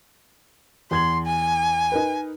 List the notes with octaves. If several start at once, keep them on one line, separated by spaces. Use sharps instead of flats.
E2 C6 G#6 F#7
G#5
D#4 A#4 B4